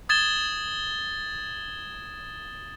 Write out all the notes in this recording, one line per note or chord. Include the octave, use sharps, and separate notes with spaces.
D#6 G#6 A6 E7 G7